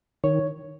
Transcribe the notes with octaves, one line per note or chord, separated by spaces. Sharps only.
D#3 C#5